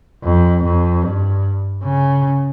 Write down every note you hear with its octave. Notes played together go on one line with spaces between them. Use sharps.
F2
F2
G2
C#3